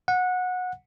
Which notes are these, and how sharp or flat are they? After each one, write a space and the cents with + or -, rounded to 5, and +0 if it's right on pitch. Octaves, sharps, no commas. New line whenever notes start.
F#5 -20